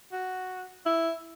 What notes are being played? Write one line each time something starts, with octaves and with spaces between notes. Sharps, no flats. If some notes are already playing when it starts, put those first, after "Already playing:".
F#4
E4